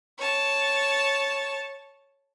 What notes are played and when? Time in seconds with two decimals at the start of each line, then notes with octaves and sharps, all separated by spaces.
0.18 C#5 A5